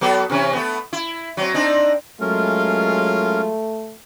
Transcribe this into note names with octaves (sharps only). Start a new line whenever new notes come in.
F#3 B3 A4
C3 E3 C#4
A3 B3
E4
F#3 C4
C4 D4 D#4
F#3 G#3 A3 C#4 F4 A#4